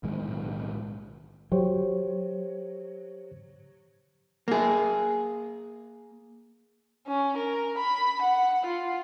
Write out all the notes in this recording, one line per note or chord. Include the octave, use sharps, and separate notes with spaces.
B1 A2 D#3 G#3
F#3 G4 C5 C#5
A#3 G#4
C#4
A#4
B5
F#5
F4